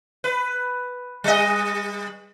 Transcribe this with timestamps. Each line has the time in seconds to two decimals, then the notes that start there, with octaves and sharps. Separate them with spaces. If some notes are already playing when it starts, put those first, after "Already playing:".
0.24 B4
1.24 G3 D#5